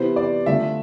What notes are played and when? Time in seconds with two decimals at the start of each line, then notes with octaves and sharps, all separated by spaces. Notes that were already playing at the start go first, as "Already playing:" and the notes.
Already playing: C3 E3 B3 E4 C5
0.16 D5
0.46 D3 A3 D4 F4 E5